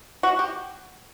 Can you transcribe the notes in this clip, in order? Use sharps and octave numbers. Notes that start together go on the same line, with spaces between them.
F#4
G4